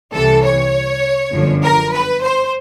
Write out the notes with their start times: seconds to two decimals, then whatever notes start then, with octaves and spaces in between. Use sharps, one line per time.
0.13 C2 C3 E3 A4
0.44 C#5
1.32 G1 F#2 D3 F3
1.63 A#4
1.92 B4
2.22 C5